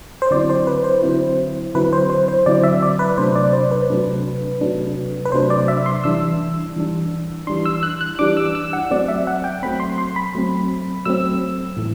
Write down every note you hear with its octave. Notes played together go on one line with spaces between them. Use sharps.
C5
D3 F#3 C4 E4 D5
C5
B4
C5
D3 F#3 C4 E4
D3 F#3 C4 E4 B4
C5
C5
C5
D3 F#3 C4 E4 D5
E5
D5
B4
C3 F#3 A3 D4 C5
D5
C5
B4
C3 F#3 A3 D4
C3 F#3 A3 D4
B4
C3 F#3 A3 D4 C5
D5
E5
C6
E3 G3 D4 E6
E3 G3 D4
E3 G3 D4 C6
E6
F#6
F#6
E3 G3 D4 D6
E6
E6
F#5
F#3 A3 C4 D5
E5
F#5
G5
F#3 A3 C4 B5
C6
C6
B5
F#3 A3 C4
F#3 A3 C4 E6
A2 E3 A3